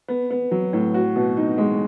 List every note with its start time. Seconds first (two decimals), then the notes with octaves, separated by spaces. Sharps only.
0.08 B3
0.31 B3
0.51 F#3
0.73 A2
0.94 F#4
1.16 B2
1.37 D#4
1.58 G#3